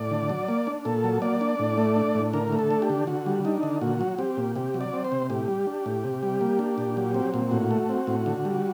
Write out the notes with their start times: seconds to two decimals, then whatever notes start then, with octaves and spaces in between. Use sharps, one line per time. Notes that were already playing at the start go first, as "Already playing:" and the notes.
Already playing: A2 D5
0.11 D3
0.29 F#3
0.48 A#3
0.67 D4
0.85 A#2 A4
1.04 F#3
1.22 A#3 D5
1.41 D4
1.59 A2
1.78 A3
1.96 D4
2.15 A2
2.33 D3 A#4
2.52 A3
2.59 A4
2.71 D4
2.82 G4
2.90 D3
3.07 D3 F#4
3.26 G3
3.45 D4 D#4
3.63 D3
3.81 A#2 F#4
4.01 F#3
4.19 C4 G4
4.37 A#2
4.56 C3 G4
4.74 F#3
4.81 D5
4.93 C4
5.04 C5
5.12 C3
5.30 A2 G4
5.48 G3
5.67 D4
5.86 A2
6.04 C3
6.23 G3
6.41 A#3
6.59 D4
6.78 A#2
6.97 F#3
7.14 C4
7.34 A#2
7.51 A2 F#4
7.71 A3
7.89 C4
8.07 A2
8.26 D3
8.45 G3